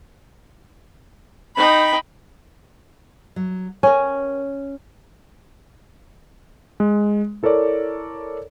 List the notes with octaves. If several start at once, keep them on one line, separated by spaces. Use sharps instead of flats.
D#4 G5 B5
F#3
C#4 A#4 G5 G#5
G#3
E4 A4 A#4 C#5 D5